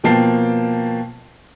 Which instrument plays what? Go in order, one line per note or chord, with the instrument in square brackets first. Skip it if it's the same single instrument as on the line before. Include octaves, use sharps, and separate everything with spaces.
[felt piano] B2 F3 A#3 G5 A5 C7